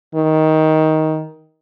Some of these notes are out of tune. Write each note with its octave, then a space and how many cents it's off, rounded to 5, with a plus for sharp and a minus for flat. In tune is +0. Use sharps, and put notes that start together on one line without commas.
D#3 +15